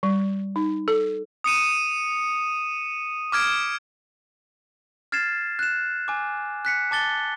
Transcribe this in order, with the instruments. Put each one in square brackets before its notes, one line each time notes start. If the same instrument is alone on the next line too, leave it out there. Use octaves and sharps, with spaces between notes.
[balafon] G3
D#4
A4
[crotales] D#6 C#7 D#7 E7
D6 F6 G#6 D7
[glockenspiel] F6 G#6 A6 C7 E7
F#6 E7
G#5 D6
F#6 B6 C#7
A5 D6 A6 G7